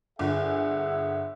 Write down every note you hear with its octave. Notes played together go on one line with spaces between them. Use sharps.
G1 G#4 E5 F#5